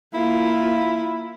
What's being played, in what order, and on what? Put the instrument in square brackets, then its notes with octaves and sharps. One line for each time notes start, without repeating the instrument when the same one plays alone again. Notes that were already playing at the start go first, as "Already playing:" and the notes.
[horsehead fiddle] A#3 F4 [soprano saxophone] E4